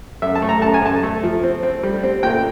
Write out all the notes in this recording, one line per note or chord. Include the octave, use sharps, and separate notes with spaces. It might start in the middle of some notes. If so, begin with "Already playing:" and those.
F#2 E5
A5
A3
A#5
F#2 A5
G#5
F#2 A5
A3
F3
C4
C4
G3
C4
A#2 G5